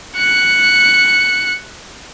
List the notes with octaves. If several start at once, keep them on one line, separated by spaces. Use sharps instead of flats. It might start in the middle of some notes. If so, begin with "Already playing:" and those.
F#6 C#7